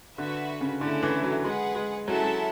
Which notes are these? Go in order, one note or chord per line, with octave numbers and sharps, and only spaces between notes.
D3 F#4 B4 E5
C#3
D3 A3 C#4 E4 A4
E3
F#3
G#3 G#4 B4 F#5
G#3
F#3 C#4 E4 A4 E5 A5
F#3